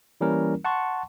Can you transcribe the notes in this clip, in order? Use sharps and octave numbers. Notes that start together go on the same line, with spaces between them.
E3 G3 A#3 C#4 E4 A#4
F#5 A5 C6 C#6